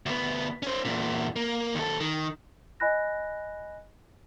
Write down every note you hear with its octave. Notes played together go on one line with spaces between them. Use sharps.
D2 B3
C#4 C5
E2 A#2
A#3
D#2 A4
D#3
D#5 G#5 B5 F#6 A#6